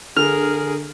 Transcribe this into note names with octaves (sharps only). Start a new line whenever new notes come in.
D3 G#4 A#4 F6